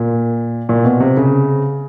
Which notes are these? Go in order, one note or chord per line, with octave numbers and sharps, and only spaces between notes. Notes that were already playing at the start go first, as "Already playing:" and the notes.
Already playing: A#2
A#2
B2
C3
C#3